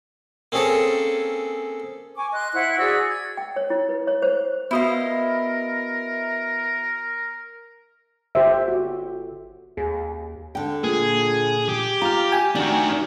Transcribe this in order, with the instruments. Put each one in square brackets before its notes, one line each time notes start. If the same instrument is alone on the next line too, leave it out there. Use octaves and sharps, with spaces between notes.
[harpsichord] A#3 C4 C#4 G#4 A4
[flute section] G#5 C#6 D6
D#5 C6 F#6
E4 C5 F#5 F#6
F#4 G#4 D5 E6
G#6
[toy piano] G5
C#5
E4
B4
C#5
C5
[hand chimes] B3 F#4 [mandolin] E4 D#5 F5 [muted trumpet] A#4
[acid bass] G1 [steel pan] G4 C5 E5
[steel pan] F#4
[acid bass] D#2 [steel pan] G#4
[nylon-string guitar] D3 G5
[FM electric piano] A#2 G#6 [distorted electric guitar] G#4
[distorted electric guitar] G4
[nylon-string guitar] F4 [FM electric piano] A#5 D6 F6
[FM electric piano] G5 G#5
[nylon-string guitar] D#3 [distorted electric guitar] D4 F#4